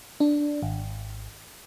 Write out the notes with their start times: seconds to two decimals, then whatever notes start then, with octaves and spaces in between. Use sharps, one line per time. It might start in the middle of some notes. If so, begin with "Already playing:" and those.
0.20 D4
0.62 G#1